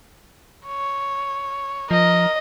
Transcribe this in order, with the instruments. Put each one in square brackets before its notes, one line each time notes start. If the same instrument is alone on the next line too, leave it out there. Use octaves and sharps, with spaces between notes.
[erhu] C#5
[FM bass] F3 [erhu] A#4 [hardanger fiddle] D#5